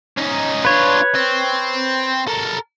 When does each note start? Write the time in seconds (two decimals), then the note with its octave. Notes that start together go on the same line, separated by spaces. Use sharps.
0.17 C#4 D#4
0.65 D4 F4 B4 C#5
1.15 C4
2.28 A4 A#4